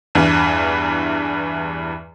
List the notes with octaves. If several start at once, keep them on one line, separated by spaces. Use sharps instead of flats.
E2 G2 E3